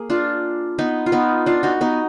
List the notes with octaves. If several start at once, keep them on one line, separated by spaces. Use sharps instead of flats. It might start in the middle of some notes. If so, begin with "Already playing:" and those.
Already playing: A#3 G#4
D4 F4
B3 D#4
F4
B3 D#4
D4 F4
D#4 F#4
B3 D#4